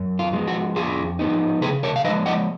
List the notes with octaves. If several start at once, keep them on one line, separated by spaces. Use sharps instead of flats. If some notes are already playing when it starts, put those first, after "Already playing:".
Already playing: F#2
F4
F3 G#3 B3
F#4
F2 F4 G#4
F3 B3 D#4
C#3 G#4 B4
A#4 C#5
F5
F3 G#3 B4 D#5
D#5 F#5